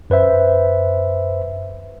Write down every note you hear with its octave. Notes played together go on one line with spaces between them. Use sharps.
F#2 B4 C5 E5